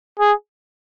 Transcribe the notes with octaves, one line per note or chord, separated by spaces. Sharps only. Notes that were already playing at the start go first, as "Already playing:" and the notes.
G#4